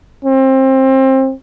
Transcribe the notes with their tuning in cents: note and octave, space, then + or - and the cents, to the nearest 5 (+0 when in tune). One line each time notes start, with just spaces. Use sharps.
C4 +25